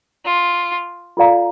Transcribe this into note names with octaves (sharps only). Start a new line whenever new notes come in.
F4
F4 A4 D5 F5 A#5